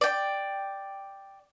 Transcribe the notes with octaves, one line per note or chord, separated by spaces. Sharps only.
D5 G5